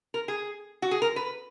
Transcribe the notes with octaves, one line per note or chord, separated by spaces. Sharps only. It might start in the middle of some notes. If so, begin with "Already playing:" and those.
A#4
G#4
F#4
G#4
A#4
B4